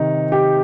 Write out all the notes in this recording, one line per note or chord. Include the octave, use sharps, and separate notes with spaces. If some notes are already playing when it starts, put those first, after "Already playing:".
Already playing: C3 D#3 D#4
G4